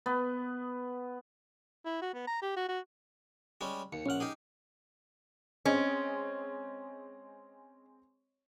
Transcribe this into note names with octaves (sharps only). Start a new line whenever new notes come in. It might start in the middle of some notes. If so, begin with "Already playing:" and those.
B3
E4
F#4
B3
A#5
G4
F#4
F#4
G3 G#3 C#4
D#2 C#7
A#1 C#4 F#5 F6
D#4 G4 G#4
G#3 C4 C#4 D#5